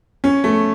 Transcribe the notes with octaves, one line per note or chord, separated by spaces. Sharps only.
C#4
A3